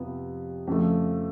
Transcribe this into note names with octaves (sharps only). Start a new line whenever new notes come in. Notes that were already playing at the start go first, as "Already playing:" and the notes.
Already playing: F2 C3 F3 B3
F2 C#3 F3 A3